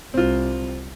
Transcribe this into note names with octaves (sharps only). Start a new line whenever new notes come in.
C2 C4 F4